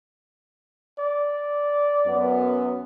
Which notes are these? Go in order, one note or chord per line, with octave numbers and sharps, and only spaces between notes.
D5
F#2 B3